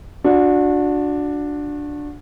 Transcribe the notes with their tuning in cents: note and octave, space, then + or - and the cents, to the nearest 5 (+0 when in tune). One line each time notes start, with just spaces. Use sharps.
D4 +0 F#4 -30